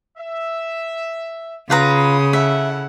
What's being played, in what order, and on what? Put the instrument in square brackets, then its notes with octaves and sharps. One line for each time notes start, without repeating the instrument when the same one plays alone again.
[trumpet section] E5
[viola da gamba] C#3 [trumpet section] B3 C6 D#6 [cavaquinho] F4 B4 A#5
[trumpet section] E4 A4 F#5 [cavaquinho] E5